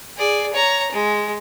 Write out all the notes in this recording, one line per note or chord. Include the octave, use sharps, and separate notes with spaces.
G#4 D5
C#5 A#5
G#3